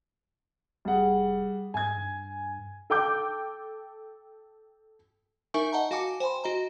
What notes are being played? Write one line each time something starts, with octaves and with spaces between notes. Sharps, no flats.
F1 G3 G#4 F#5
G#2 G#5 G#6
G2
A4 G5 D6 G6
D#4 A#4 E5 G#5 C#6
D#5 F#5 A5 A#5
F#4 F5 G#5 A5 D6 C#7
C5 G5 G#5 B5 C6
F#4 D#5 A#5